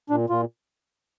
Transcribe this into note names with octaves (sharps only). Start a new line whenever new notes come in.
A#2 D4
A#2 F4